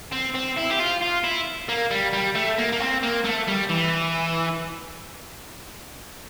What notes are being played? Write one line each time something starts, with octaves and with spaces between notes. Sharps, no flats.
C4
C4
E4
G4
F4
F4
E4
A#3
G3
G3
A3
A#3
A#3
C4
A#3
A3
G3
E3